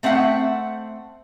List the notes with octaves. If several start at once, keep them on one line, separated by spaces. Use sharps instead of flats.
A3 C4 E5 F#5